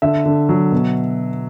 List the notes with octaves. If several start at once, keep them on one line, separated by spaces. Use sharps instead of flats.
D3 E5
D3
F#3
B2